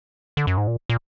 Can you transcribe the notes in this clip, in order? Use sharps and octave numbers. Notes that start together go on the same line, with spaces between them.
D3
F#2
G#2
A#2
A#2